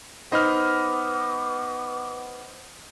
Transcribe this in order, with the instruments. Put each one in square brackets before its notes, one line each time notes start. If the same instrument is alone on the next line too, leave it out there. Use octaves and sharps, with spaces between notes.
[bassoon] B3 [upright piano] D#4 D#5 [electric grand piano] C5 B5 F6 [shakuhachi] D6